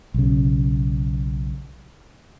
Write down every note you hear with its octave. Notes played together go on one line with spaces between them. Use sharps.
B1 C#3